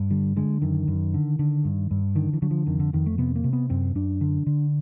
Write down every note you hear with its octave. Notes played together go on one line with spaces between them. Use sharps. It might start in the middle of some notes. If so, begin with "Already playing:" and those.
Already playing: G2
D3 G3
D3 G#3
F#2 D#3
F#2
D3
D3
G2
G2
D3 D#3
E3
D3 F#3
F3
F2 D#3
D3
F2 D#3
A3
C3 B3
A#3
C3
B3
F#2 C4
F#2 D4
D3
D3